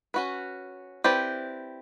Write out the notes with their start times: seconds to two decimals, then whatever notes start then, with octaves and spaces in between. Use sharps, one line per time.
0.14 C#4 F#4 B4
1.04 C4 E4 G4 B4 D5